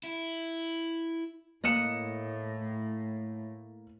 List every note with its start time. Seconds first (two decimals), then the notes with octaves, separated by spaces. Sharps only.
0.04 E4
1.64 A2 A#3 D#5 F#6 C#7 E7